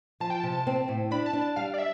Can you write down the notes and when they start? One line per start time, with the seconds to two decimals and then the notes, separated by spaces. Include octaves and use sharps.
0.20 F3 A5
0.30 G5
0.40 C3 A5
0.67 C4
0.88 A2
1.11 D4 B5
1.26 A5
1.33 D4
1.41 A5
1.56 G3 F5
1.74 D5
1.78 E5